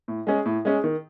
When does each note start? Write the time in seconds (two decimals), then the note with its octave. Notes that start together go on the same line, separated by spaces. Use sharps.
0.08 A2
0.27 G#3 C#4 G#4
0.45 A2
0.65 G#3 C#4 G#4
0.84 D#3